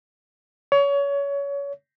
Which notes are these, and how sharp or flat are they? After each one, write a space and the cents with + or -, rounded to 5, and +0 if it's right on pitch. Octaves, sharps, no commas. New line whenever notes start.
C#5 +25